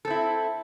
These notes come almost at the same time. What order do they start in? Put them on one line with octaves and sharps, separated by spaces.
A4 C4 E4